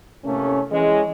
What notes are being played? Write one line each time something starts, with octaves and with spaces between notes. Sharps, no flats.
A2 C3 A3 A#3 C#4
E3 G#3 C#4